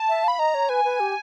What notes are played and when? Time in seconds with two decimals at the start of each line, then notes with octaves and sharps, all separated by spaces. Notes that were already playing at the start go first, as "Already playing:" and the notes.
Already playing: A5
0.09 E5
0.24 F5 B5
0.39 D#5 A#5
0.54 C#5
0.69 B4 G#5
0.84 B4
1.00 G4